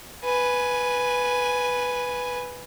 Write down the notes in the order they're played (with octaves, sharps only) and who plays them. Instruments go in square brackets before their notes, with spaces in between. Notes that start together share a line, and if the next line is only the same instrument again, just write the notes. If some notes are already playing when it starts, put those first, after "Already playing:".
[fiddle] B4 G#5